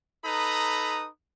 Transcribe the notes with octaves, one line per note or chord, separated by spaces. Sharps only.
D#4 A4 B4 A#5 B5 D#6